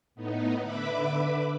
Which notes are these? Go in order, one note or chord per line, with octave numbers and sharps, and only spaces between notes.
A2 B3 D#4
D3 B4 E5 B5 D6